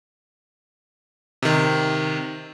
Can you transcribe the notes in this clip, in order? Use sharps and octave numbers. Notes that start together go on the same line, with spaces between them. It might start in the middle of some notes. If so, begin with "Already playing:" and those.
C3 D#3